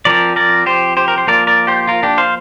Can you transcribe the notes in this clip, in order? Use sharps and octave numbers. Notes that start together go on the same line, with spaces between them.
F3 C4 A#4 D5
A#4 D5
G4 C5
G4 C5
A#4
C5
F3 A#3 A#4 D5
A#4 D5
G4 C5
F4 A#4
D4 G4
C5 F5